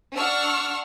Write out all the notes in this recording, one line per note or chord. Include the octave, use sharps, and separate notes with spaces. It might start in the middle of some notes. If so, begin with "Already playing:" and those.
D4 F#5 C#6 E6 F6